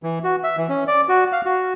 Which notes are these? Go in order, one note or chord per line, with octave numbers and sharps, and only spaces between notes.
E3
F#4
E5
E3
C#4
D5
F#4
F5
F#4